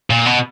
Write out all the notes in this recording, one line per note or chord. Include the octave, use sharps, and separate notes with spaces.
A#2
B2